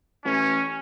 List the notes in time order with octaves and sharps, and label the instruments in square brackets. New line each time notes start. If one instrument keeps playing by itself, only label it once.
[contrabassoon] A1 [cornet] C#4